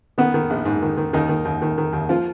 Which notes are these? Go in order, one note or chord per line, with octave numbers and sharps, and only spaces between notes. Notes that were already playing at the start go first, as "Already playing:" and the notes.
D#3 B3
D#3
A#1
G#2
D#3
D#3
D#2 D#3 D#4
D#3
D#2
D#3
D#3
D#2
F3 F4